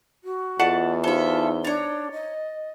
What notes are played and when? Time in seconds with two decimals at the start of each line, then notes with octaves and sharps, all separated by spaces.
0.24 F#4
0.60 E2 F4 D5 D#5 F#5 A5
1.04 D#4 F4 A4 C5 E5 G7
1.64 D4 C#5 A#5 A6
2.12 D#5